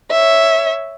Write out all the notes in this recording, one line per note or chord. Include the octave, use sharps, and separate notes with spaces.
C#5 E5